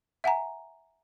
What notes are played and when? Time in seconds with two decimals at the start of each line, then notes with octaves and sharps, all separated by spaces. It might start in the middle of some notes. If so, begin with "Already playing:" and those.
0.24 E5 F#5 G#5 A#5